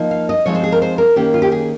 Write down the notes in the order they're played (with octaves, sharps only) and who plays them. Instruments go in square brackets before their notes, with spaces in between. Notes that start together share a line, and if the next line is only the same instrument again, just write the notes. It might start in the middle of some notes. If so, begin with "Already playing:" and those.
Already playing: [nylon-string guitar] F3 A#3 D#4
F5
D#5
F3 G#3 C4 D#4 C#5
C5
G#4
A#4
C5
A#4
D#3 A#3 C#4 G4
F4
G4
G#4